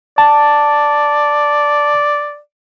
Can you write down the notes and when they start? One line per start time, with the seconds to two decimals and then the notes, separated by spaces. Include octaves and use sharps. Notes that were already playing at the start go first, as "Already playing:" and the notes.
0.18 D5 A5